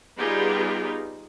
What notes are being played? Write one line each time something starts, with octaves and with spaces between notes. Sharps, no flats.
G3 B3 D#4 F4 G4 G#4